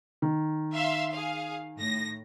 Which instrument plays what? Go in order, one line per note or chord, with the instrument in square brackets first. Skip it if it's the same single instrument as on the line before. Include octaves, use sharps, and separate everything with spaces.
[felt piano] D#3
[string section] E5 F5 C6
G#4 F5
A2 A#6